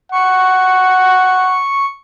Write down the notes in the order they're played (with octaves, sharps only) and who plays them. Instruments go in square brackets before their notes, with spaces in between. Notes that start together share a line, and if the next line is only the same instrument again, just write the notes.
[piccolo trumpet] F#5 [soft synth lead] C#6